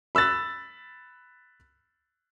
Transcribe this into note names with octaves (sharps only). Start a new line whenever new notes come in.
B5 E6 F#6 A6